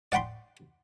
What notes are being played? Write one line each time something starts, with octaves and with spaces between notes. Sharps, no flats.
D5 F#5 G5 B5 C6